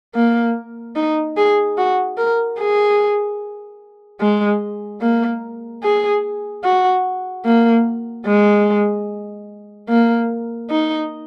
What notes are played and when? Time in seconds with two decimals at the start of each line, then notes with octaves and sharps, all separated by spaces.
0.15 A#3
0.96 D#4
1.37 G#4
1.78 F#4
2.18 A#4
2.59 G#4
4.21 G#3
5.01 A#3
5.84 G#4
6.64 F#4
7.45 A#3
8.26 G#3
9.89 A#3
10.70 D#4